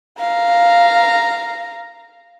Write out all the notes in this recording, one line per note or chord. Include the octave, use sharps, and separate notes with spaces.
F5 A#5